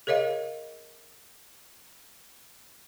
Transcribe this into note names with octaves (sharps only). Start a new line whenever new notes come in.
G#4 A#4 C#5 D#5 F5